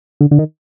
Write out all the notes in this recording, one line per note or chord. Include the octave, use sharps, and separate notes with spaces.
D3
D3
D#3